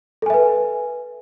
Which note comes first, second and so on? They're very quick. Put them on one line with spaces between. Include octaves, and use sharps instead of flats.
A4 G#5 E5 B4